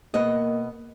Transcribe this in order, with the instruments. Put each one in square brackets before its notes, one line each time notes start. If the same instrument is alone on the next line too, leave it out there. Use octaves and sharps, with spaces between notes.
[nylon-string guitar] B2 B3 D#5 [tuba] A#3